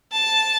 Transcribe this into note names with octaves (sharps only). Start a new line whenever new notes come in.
A5